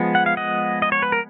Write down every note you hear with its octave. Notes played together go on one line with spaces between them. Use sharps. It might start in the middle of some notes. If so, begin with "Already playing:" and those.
Already playing: F3 G#3 B3
F#5
F5
D#5 F#5
D#5
C#5
B4
A#4